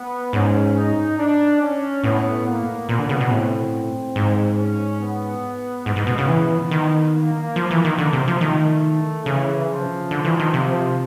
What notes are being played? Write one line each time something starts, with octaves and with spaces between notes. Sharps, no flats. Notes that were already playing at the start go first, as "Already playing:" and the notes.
Already playing: B3
G#2 C#4
D#4
D4
C#4
A2 B3
A#3
A#2 B3
D3
C#3
B2
A2 C4
G#2
C#4
B3
G#2 B3
G#2
B2
C#3
E3
D#3
A#3
F3
E3
D#3
D3
C3
F3
D#3 A3
C#3 E3
F3
D3
E3
D#3
C3 F3